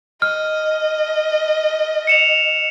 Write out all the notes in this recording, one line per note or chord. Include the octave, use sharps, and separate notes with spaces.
D#5 F6
C#7 E7 F7